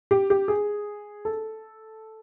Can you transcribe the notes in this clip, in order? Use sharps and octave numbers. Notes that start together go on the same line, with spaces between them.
G4
G4
G#4
A4